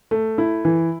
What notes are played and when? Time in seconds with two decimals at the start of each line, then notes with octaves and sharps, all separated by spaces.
0.11 A3
0.38 E4
0.65 E3